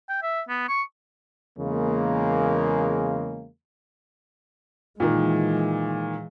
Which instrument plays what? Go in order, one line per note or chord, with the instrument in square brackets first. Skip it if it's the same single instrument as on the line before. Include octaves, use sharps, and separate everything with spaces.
[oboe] G5
E5
B3
C#6
[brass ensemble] E2 C#3 G#3 A#3
[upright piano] A#2 D#3 [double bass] E3 G#3